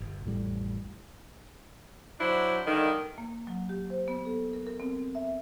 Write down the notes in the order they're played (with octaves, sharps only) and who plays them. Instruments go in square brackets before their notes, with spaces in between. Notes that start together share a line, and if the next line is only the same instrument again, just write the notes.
[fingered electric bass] G1
A1 F2 A2 G3
[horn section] F#3 D4 E4 C5
G2 D3 D#3
[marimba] A#3
F#3
G4
C5
B3
A4
A#4
A#4
C4
E5